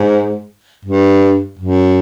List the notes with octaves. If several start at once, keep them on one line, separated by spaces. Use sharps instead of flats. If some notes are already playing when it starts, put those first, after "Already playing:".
Already playing: G#2
G2
F#2